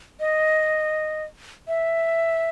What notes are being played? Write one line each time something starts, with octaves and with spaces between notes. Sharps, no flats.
D#5
E5